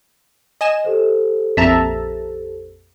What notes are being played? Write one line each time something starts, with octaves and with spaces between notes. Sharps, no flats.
D#5 G#5 E7
G4 A4 C5
A#1 F2 E5 A5 A#5